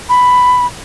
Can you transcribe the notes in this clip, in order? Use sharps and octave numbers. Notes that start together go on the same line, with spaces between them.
B5